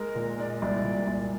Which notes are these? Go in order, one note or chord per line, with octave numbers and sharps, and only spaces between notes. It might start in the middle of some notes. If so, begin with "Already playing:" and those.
Already playing: G#3 A#4
A#2
G#3 D5
D#5
C2 D5
A#2
C2